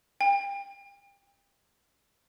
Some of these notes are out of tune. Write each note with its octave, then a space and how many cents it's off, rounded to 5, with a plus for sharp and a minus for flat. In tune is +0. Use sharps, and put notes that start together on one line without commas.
G5 +30